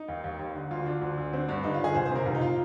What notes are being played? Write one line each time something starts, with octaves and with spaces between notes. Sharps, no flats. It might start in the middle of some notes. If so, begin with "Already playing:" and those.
Already playing: D#4
D#2
D#2
D#2
D3
D2 F4
D3 D4
D2
D2
D3 C4
G2 D4
D3 D#4
F4
D3 G#4
C2 C5
C5
C3 A#4
C2 F4
D#4
F4